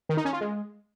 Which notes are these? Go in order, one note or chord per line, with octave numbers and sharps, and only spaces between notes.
D#3
D#4
C#4
F4
G#3